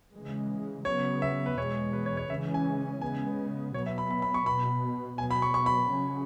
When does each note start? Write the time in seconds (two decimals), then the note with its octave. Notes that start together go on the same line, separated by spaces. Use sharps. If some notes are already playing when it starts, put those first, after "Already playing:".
0.14 C#3 E3 G#3
0.85 C#3 F#3 B3 C#5
1.22 E5
1.46 B4
1.57 E2 B2 G#3 C#5
1.93 B4
2.06 C#5
2.17 C#5
2.30 C#3 E3 G#3 C#4 E5
2.54 G#5
3.01 C#3 G#3 B3 G#5
3.74 B2 F#3 B3 C#5
3.86 E5
3.98 B5
4.11 B5
4.22 B5
4.34 C#6
4.46 B2 B3 B5
5.18 B2 F#3 B3 G#5
5.31 B5
5.42 C#6
5.54 C#6
5.66 B5
5.90 C#3 F#3 C#4